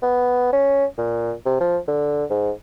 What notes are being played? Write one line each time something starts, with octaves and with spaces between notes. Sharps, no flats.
B3
C#4
A#2
C3
F3
D3
G#2